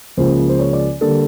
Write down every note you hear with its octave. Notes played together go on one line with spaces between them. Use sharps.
C#2 C#3 F3 A#3 C5
C5
C#5
D5
D3 G3 A#3 D4 A4